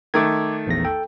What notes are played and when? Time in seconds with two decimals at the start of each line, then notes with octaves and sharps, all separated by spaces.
0.14 D#3 A3 D6 G#6
0.67 A#1 E2 A#6
0.85 A4 G5